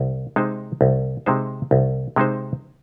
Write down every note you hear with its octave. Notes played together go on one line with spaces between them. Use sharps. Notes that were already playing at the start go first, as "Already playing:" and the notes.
Already playing: C2
C3 G#3 D#4 C5
C2
C3 G#3 D#4 C5
C2
C3 G#3 D#4 C5